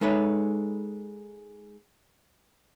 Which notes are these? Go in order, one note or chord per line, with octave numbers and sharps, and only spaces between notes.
G#3 D#4 A4 B4 C#5 E5